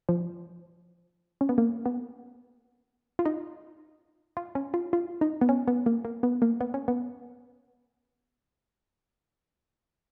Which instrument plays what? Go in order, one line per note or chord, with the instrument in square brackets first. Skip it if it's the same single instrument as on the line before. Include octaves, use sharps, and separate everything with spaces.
[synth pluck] F3
C#4
B3
A#3
B3
F4
D#4
F4
C#4
F4
F4
D#4
B3
C#4
B3
A#3
A#3
B3
A#3
B3
C#4
B3